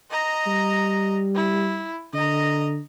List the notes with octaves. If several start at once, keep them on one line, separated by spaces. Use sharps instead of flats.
D#5 A#5
G3
E4
D3 D#5 A#5